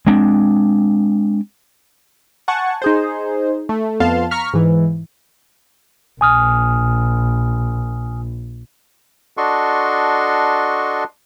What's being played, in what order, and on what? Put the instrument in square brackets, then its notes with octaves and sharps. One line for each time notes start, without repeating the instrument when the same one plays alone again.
[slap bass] G#3 C4 D4
[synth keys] F#5 G#5 A5 C#6
D#4 G#4 C5
A3
F2 B3 F5 A5 C6
A#5 C#6 F6 B6
G#2 E3
[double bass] A#1 [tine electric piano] G#5 D#6 F6
[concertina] D4 F#4 A4 D#5 C6 C#6